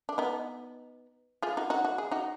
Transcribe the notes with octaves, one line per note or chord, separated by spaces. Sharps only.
D4
B3 D#4
F4 G#4
D#4 F#4
D#4 F#4
F#4
G#4
D#4 F#4